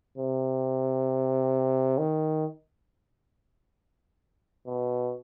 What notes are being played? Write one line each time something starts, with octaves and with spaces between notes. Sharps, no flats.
C3
D#3
B2